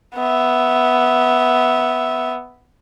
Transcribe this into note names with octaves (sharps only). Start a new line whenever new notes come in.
B3 E5